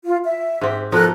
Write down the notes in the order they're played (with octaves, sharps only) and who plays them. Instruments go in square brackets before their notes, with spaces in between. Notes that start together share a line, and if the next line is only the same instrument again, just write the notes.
[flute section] F4
E5
[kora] G#2 C4 G4
[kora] B2 F3 D#4 [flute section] A4 A#4 F#6